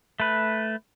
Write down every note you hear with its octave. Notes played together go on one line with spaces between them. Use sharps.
A3 B4